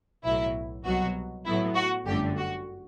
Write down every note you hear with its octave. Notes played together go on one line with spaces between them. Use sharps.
B1 A2 F#3 E4
C2 B2 F#3 F#4
A2 F#3 B3 E4
F#4
G1 F#2 D3 A3 G4
F#4